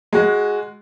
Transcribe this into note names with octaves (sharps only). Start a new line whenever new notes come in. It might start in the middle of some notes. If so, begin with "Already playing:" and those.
G#3 F#4